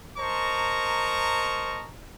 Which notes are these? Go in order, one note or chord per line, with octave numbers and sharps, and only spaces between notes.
A#4 C5 D#5 A5 A#5 C#6